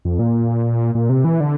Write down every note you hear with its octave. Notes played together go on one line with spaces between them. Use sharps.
F2
A#2
A#2
C3
E3
D3